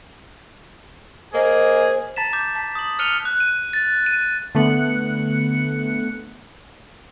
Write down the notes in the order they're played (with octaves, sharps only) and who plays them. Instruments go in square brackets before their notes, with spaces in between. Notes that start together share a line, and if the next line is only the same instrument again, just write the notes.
[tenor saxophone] A#3 [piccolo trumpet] G#4 [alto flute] C5 [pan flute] D#5
[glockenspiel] A5 A#5 A6 B6 E7
D6 G6
A5 B6
D#6 F#7
F6 F#6 C#7 D#7 F7 G7
[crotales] F#6
D#7
A6
D#7
[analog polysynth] D3 A3 B3 F#6 C#7